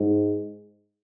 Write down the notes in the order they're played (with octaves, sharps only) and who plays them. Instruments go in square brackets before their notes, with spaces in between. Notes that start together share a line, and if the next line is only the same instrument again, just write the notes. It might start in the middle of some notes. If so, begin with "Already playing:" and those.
Already playing: [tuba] G#2